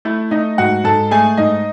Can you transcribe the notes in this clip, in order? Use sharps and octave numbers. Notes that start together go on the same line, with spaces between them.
A3 E4
A3 D#4 D#5
G#2 F#4 F#5
G#2 A4 A5
A3 G#4 G#5
G#2 D#4 D#5